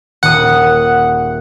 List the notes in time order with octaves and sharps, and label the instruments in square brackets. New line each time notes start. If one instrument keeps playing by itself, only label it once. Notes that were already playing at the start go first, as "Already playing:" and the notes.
[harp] D#1 D#6 [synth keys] F#5